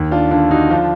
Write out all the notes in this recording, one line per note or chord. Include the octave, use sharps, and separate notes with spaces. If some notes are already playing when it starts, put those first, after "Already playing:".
Already playing: D#2
D4 F4
D3 D4 F4
D#4 F#4
F3 D4 F4